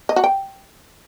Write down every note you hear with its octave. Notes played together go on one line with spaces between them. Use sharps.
D#5
F#4
G5